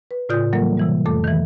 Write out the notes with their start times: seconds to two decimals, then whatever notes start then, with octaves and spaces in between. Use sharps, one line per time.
0.11 B4
0.29 A2 C#3 F4 D5 D#6 G6
0.53 E3 F#3 G3 A#3 A4 A#4
0.77 C3 E3 G3
1.06 F2 A3 A4 D6
1.24 D#3 E3